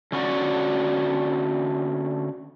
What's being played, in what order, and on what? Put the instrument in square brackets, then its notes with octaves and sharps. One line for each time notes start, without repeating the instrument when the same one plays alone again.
[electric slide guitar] D3 C#4 F4 F#4 D5